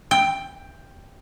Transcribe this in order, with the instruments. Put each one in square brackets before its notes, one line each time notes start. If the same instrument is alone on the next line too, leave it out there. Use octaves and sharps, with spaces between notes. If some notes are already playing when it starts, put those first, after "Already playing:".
[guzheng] G5